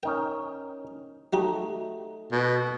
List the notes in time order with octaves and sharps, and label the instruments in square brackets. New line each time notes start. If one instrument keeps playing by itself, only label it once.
[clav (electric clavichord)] C#4 D#4 A#4 [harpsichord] G5
[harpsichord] F#3 F#4 G4 [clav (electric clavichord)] A3 D#4
[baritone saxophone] B2